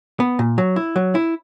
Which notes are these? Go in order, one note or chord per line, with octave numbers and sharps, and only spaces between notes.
B3
A#2
F#3
E4
F#3
E4